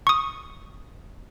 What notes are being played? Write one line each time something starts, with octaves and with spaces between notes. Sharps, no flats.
C#6 D#6